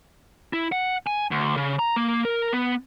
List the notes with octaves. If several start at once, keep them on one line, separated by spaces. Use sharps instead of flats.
E4
F#5
G#5
D2
C#3
A#5
A#3
A#4
B3